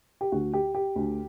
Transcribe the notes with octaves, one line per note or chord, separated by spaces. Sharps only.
G4
D2 D3 F#4
G4
G4
D2 D3